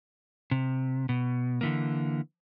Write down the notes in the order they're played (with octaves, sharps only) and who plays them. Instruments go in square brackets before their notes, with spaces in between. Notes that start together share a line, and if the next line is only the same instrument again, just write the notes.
[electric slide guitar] C3
B2
D3 E3 A#3